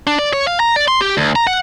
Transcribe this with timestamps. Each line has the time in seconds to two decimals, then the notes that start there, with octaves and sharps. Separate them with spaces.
0.07 D4
0.19 D5
0.33 C#5
0.47 F5
0.60 A#5
0.76 D5
0.88 C6
1.01 G4
1.17 D2
1.36 A#5
1.47 F#5